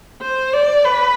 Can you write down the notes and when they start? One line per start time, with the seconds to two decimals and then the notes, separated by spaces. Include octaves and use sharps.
0.22 C5
0.53 D5
0.85 B4